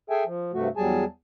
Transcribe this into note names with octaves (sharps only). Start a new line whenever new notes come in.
G#4 A4 E5 G5 G#5
F3
G2 C3 A3 F#4
E2 F#3 G3 G#4 G#5 A5